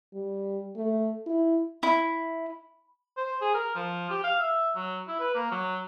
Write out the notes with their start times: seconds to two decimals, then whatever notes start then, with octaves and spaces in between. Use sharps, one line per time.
0.14 G3
0.76 A3
1.26 E4
1.83 E4
3.17 C5
3.41 G#4
3.54 A#4
3.75 F3
4.10 G4
4.24 F5
4.40 E5
4.75 F#3
5.07 E4
5.19 B4
5.35 A#3
5.51 F#3